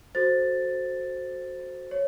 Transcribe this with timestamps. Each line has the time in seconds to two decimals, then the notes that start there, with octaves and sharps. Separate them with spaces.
0.15 F#4 A4 C5 A6
1.91 C#5